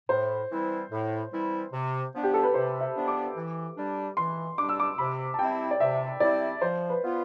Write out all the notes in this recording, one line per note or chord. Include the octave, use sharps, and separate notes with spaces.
A2 C5
E3 G3 C4 E4
A2
E3 G3 C4 E4
C3
F3 B3 D4
G4
A4
B4
C3 C5
E5
F3 B3 D4
D6
E3
G3 D4
E3 C6
G3 D4 D6
E6
D6
C3 B5
A5
G3 C4 E4 G5
D5
C3 E5
G3 C4 E4 D5
F3 C5
B4
B3 F4